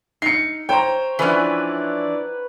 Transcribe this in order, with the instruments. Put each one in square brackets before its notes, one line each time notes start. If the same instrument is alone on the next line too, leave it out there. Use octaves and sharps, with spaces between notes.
[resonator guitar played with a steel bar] D#4 [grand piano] C7 C#7
[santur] C5 C#5 [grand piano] G5 A#5
[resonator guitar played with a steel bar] E3 F3 C#4 [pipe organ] D4 E4 D5 [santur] B4 F#5